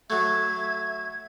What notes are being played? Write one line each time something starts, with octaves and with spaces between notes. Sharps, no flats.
F#3 A3 E5 G#6